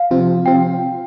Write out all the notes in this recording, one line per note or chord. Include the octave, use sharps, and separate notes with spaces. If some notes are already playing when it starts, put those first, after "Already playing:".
Already playing: F5
C3 F3 C4 F4
C3 F3 C4 F4 G5